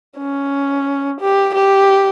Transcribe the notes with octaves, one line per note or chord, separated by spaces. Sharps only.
C#4
G4
G4